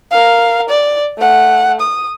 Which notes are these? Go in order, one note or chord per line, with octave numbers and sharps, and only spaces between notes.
A#4 F5
D5
A3 F#5
D#6